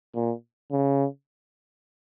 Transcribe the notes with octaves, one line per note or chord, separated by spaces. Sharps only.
A#2
C#3